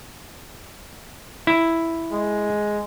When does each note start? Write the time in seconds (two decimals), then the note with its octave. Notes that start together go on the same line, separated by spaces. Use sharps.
1.47 E4
2.12 G#3